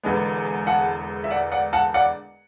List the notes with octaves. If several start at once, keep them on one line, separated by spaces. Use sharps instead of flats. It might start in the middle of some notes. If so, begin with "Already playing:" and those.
E1 E2 D3 G#3 B3
F#5 A5
E5
D5 F#5
D5 F#5
F#5 A5
D5 F#5